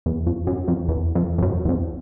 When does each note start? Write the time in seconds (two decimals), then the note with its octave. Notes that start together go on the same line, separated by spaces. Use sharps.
0.06 E2
0.27 F2
0.47 F#2
0.68 F2
0.88 E2
1.15 F2
1.38 F2
1.42 F#2
1.65 E2
1.69 F2